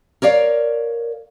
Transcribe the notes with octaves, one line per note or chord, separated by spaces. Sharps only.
A#4 C#5 D5 F5